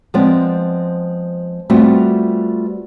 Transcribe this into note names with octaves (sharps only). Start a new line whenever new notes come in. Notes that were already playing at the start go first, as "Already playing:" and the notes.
F3 G#3 B3 C4 D5
G3 A3 B3 C4 F4 F#4